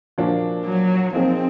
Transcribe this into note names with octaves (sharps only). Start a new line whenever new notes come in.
A#2 F3 A#3 D4 F#4
F#3
F3 A#3 C4 D#4 G#4